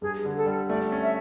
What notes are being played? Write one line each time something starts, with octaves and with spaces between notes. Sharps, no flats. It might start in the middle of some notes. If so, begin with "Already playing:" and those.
G2 G#4
D3
A4
G3
A3 D5
C#4
E5